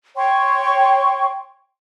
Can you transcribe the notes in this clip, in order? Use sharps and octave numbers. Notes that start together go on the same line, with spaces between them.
C#5 G5 C6 C#6